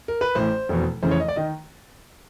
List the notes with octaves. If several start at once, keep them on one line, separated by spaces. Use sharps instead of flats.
A#4
B4
A1 A2 E3 C5
F1 E2 B2
F1 E2 C#3 E3 C5
C#5
D#5
D5
D#3 D#5